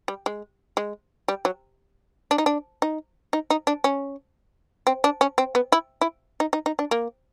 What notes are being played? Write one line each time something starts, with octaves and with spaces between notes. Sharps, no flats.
G3
G#3
G#3
G3
F#3
D4
D#4
D4
D#4
D#4
D#4
D4
C#4
C4
D4
C#4
C4
B3
E4
E4
D#4
D#4
D#4
D4
A#3